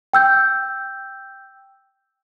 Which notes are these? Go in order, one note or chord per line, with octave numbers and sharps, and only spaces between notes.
G5 E6 G6